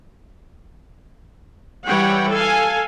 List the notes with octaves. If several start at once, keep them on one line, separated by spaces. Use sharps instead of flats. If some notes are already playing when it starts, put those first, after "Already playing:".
E3 G3 C#5 F#5 G5
A4 F5 G#5